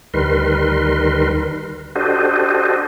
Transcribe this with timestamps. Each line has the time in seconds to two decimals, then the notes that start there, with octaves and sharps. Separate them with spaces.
0.14 D2 D#3 G3 A#4 B4 C6
1.95 D4 F#4 G4 A4 C5 D#5